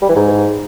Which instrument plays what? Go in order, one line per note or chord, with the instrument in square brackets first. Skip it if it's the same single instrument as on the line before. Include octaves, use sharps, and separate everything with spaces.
[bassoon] G3
E3
G#2